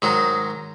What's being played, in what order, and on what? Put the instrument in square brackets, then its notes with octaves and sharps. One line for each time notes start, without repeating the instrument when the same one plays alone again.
[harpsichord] G#2 D#3 F#3